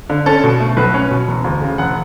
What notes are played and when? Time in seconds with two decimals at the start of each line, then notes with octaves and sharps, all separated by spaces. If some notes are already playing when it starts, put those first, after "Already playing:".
0.10 D3
0.26 C#4 A4
0.44 B2
0.60 A3
0.77 B1 B4
0.94 C#4
1.11 B2
1.27 E1
1.44 D2
1.62 C#3
1.78 E1 F#5